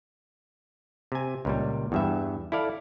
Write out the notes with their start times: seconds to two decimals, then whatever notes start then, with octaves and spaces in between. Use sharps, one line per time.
1.12 C3 G#5
1.45 C#2 A#2 G3
1.92 E2 G2 E5
2.52 E4 A4 D5 F5